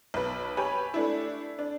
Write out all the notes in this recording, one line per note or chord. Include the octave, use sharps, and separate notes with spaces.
B1 B4
G4 B4 C#5 G#5 B5
A3 D4 E4
D4